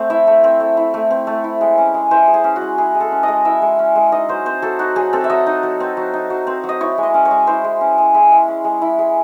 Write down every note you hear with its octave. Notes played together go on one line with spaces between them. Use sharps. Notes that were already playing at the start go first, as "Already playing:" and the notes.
Already playing: A3 C4 C5
E4 E5
A3
C4
A3
E4
A3
C4
A3
E4
G#3
C#4
G#3
E4 C5
G#3
G#4
C#4
F#4
G#3
E4 G#4
G#3
A4
C#4
G#3 D#5
E4 E5
G#3
C#4
G#3
D#4 D#5
F#3 C5
C4 C5
F#3 A4
D#4 F#4
F#3 G#4
C4 A4
E5
F#3 D#5
D#4
F#3
C4
F#3
D#4
F#3
C4
F#3
D#5
E4 C#5
G#3
D#5
C#4
C#5
G#3
E4 C5
G#3
C#4
G#3
E4 G#4
G#3
C#4
G#3
E4
G#3